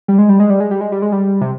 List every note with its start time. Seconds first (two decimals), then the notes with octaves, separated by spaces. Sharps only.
0.08 G3
0.19 G#3
0.29 G3
0.40 G#3
0.50 G3
0.60 G#3
0.71 G3
0.81 G#3
0.92 G3
1.02 G#3
1.12 G3
1.41 C3